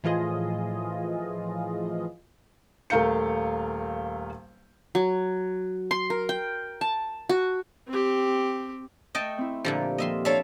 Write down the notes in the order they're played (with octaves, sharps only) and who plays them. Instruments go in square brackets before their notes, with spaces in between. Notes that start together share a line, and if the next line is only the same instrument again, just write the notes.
[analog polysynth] A2 E3 F3 F4 G#4 D#5
[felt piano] D#1 A3 A#4 F5 G6 C#7
[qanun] F#3
C6
A#4
G5
A5
F#4
[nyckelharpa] C4 G4
[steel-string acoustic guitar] A3 [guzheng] D#5 G5 A5
[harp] C4 E4
[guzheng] A#2 D3 F3 [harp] G4 A5
[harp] G4
[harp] D#2 F3 [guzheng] D#5 E5 C6
[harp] D4 D5 [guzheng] A4 E5 [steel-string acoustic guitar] C#5 F5